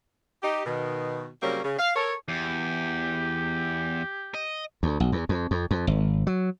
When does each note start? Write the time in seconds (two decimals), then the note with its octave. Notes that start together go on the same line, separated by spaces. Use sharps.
0.43 D#4 G4
0.66 B2 D#3
1.42 C#3 F#3 G3 A#3 C4 C#4
1.63 C#3
1.78 F5
1.95 A4 A#4 C#5
2.28 E2 G4
4.34 D#5
4.83 D2
5.00 B1
5.12 E2
5.29 F2
5.51 F2
5.71 F2
5.87 G#1
6.27 F#3